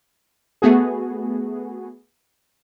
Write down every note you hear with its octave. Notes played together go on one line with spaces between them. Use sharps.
A3 B3 F#4 G#4